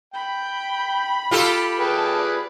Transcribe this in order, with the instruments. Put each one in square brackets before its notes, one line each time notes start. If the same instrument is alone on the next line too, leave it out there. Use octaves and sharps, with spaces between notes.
[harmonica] G5 [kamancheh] B5
[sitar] F4 G4 A4
[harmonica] G#4 B4 [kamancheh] G5 A5
[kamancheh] D5